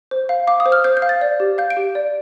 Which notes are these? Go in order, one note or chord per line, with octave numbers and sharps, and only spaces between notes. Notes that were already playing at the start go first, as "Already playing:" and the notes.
C5
F5
F5 D6
D#6
C5
F6
C5 G6
G6
F5
A6
D5
G4
F5 G6
D7
G4
D5